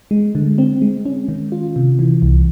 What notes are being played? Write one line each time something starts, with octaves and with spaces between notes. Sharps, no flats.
G#3
D3
C4
G#3
C#4
D#3
F4
C3
E3
C2